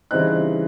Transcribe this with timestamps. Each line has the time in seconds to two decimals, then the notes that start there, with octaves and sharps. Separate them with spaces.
0.11 C#3 E3 G3 C4 D#4 F#6